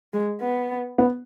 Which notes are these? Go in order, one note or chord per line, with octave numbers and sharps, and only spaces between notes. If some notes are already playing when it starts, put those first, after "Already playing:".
G#3
B3
B3